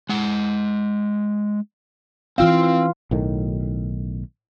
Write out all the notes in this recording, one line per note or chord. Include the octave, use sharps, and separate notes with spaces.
G#3 F#5
E3 C4 F4 F5
B1 A2 D#3